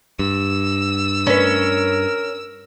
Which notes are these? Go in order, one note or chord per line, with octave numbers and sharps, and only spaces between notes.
G2 E6
C#4 A#4 B4